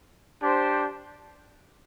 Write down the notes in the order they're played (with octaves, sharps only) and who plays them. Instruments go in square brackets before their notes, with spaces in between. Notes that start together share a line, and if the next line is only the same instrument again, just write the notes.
[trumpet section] D4 G4 C5